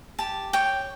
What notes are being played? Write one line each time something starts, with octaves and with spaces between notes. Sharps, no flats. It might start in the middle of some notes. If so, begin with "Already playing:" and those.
G4 A5
C#5 G5